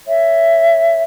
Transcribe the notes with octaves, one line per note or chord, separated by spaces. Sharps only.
C#5 E5